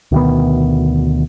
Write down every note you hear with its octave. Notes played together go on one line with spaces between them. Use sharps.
D2 B2 D#3 B3